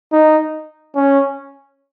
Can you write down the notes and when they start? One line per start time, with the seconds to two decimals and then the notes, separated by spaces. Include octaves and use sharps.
0.12 D#4
0.95 C#4